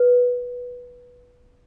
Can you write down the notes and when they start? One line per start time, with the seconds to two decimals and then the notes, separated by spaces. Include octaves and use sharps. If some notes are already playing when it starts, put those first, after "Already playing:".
Already playing: B4